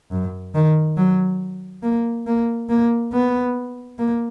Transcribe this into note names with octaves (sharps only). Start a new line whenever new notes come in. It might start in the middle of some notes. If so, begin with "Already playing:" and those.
F#2
D#3
F#3
A#3
A#3
A#3
B3
A#3